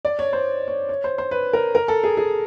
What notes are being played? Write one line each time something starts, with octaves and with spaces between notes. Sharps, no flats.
D5
C#5
C5
C#5
C#5
C5
C5
B4
A#4
A#4
A4
G#4
G#4